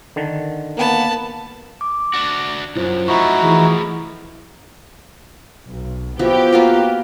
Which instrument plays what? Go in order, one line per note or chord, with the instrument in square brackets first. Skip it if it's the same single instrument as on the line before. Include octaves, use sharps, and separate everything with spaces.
[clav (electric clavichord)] D3 D#3
[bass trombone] A#3 [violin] B3 A5
[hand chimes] D6
[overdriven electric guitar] D4 F#4
[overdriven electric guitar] B1 F#2 [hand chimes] E4 F4 C5
[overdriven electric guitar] F3 A3 [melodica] D#4 E4 F#4 [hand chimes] C#6
[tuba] E3 [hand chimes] G#4
[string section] B1
[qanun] F3 E4 F#4 [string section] B3 G4
[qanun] A#3 F4 F#4